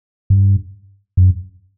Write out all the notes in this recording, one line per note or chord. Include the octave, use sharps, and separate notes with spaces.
G2
F#2